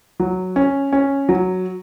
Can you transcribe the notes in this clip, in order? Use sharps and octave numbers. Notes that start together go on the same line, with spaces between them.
F#3
C#4
C#4
F#3